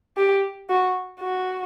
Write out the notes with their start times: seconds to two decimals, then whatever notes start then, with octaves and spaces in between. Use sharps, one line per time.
0.18 G4
0.70 F#4
1.20 F#4